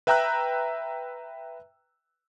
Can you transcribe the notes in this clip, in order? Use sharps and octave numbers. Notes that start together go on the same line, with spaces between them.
B4 E5 G5 A#5 E6 F#6